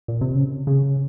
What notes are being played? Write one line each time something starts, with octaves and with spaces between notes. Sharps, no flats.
A#2
C3
C#3
C#3